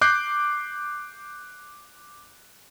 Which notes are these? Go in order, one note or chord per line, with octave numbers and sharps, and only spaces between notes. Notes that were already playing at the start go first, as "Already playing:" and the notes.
D6 F#6 G6 C7